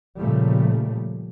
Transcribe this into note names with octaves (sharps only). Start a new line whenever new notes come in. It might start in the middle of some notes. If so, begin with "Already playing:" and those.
A#2 C#3 F3 G3 A3